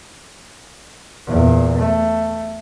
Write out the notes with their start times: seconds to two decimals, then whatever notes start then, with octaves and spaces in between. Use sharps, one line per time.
1.28 E2 A#2
1.79 A3